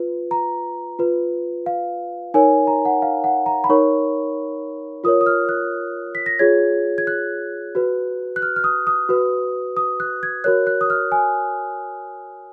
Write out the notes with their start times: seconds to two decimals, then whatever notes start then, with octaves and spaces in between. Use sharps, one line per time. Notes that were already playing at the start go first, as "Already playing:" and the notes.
Already playing: F4 B4
0.31 A#5
0.99 F4 B4
1.66 F5
2.34 D#4 A#4 C#5 G#5
2.67 A#5
2.85 F#5
3.02 F5
3.24 F#5
3.46 A#5
3.64 B5
3.69 D#4 A#4 C#5 C#6
5.04 F4 A#4 C#5 D#6
5.21 D#6
5.26 F6
5.49 F#6
6.15 B6
6.26 A#6
6.39 F4 G#4 C#5 G#6
6.98 G#6
7.07 F#6
7.75 F#4 B4
8.36 F#6
8.42 F6
8.56 F6
8.64 D#6
8.87 D#6
9.09 F#4 B4
9.77 D#6
10.00 F#6
10.23 G#6
10.44 F#4 A#4 C#5 F#6
10.67 F#6
10.81 D#6
10.90 F6
11.12 G#5